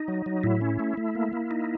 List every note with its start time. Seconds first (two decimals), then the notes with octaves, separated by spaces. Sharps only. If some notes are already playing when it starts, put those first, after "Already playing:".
Already playing: D#4
0.08 F#3
0.26 F#3
0.44 A2 E4
0.61 C#4
0.79 A3
0.97 A3
1.15 A#3
1.33 A#3
1.51 D#4